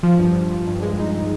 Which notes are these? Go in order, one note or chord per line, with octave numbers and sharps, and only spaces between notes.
F3
G2
G2
F3
G2
G#3
D#4